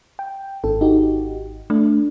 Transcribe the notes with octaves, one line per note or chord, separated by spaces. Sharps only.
G5
G#1 A4
D#4 F#4 G4
A3 D4